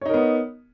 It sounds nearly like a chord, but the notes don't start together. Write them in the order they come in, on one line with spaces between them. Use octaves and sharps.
C#5 D#4 A#4 B3